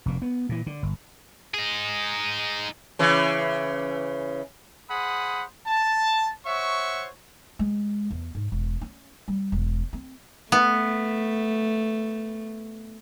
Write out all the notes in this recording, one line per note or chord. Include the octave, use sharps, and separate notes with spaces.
F1 A#2
B3
A#2 E3
D3
G1
D#4 G#4
C#3 E3
G#4 C5 F#5 B5 D#6
A5
C5 C#5 E5 F#5 C#6
G#3
E2
G#2
E1
C#4
G3
E1
C4
A3 B3